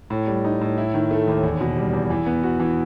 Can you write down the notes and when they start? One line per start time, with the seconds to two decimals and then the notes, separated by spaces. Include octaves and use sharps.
0.10 A2
0.27 G3
0.45 D#4
0.61 A2
0.78 E4
0.94 D#3
1.11 A3
1.28 D#2
1.43 E2
1.61 B2
1.76 G3
1.93 E2
2.10 E3
2.27 B3
2.43 F#4
2.60 E3